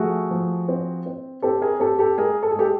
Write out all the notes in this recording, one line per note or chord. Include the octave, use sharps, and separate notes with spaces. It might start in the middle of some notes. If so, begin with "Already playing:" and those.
Already playing: F3 A3 F#4 G#4
F3
C4
C4
C4 G4 A4
G#4 A#4
C4 G4 A4
G4 A4
G#3 G#4 A#4
A4
G#4
G#3 G4 A4